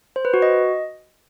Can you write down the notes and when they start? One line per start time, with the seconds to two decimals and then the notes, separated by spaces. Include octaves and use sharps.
0.16 C5
0.25 B4
0.34 F#4
0.42 D#5